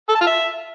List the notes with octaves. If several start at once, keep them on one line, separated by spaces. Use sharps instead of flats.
A4
A5
F4
E5